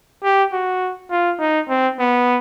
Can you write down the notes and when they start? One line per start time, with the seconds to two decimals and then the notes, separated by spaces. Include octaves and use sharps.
0.24 G4
0.53 F#4
1.11 F4
1.40 D#4
1.69 C4
1.99 B3